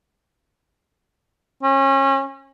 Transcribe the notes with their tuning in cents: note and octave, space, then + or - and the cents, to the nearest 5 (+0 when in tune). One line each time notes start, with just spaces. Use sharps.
C#4 -30